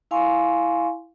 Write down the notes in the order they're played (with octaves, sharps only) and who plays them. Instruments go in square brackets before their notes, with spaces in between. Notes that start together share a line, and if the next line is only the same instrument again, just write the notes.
[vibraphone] E4 F5 G#5 C6 C#6